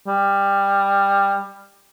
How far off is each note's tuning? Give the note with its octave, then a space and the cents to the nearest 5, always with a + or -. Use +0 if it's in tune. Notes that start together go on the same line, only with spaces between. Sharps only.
G3 +20